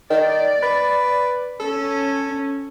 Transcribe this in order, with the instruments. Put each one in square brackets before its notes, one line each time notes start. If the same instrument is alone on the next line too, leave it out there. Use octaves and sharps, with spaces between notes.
[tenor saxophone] D#3 [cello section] D5
[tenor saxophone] B4
[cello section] C#4 [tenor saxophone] A4